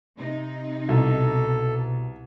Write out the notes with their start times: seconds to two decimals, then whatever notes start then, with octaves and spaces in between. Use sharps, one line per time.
0.16 C3 D#4
0.89 C2 B2 A4